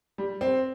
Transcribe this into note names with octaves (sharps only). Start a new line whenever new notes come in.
G3
C4